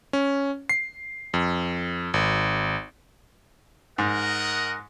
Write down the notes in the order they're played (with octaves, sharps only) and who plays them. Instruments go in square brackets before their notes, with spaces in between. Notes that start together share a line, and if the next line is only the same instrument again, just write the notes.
[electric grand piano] C#4
C7
F2
G#1
[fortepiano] G#2 [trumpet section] A#4 D#5 F#5